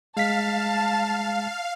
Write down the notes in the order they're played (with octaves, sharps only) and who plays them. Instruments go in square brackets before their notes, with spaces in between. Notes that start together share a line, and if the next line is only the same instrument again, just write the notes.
[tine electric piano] G#3 B6 [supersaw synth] F5 [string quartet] A5